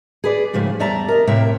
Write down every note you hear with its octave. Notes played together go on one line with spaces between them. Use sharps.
G#4 B4 D5
G#2 C#3 F3 G3 A3
E2 G3 D5 E5 A5 A#5
A#4 D#5
A2 C3 A#3 E5 G5